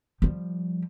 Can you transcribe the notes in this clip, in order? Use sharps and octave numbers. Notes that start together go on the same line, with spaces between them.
F3 G3